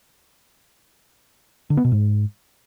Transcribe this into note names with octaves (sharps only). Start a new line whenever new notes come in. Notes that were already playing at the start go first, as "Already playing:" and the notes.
D3
B3
B2
G#2